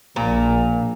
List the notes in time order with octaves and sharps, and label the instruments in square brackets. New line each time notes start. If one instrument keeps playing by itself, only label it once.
[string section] A#1 [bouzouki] A#2 A#5